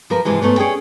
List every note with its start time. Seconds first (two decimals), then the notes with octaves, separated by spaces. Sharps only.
0.10 F3 A#4 B4
0.25 G#2 C3 E3 F3 G#3
0.42 G#2 A3 B3 C#4
0.58 C#4 G#4 D5 G5